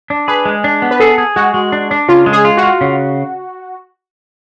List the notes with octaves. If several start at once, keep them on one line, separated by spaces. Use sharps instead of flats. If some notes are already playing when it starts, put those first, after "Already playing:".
D4
G#4 B4
G#3
D4
B3
B4
G#4 A4
G#4
G#3 F#4
G#3
D4
D4
C#3 F4
G#3
G#4
F4
F#4
F4
C#3